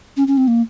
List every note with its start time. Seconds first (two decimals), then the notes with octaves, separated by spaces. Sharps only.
0.17 C#4
0.27 C#4
0.37 C4
0.47 A#3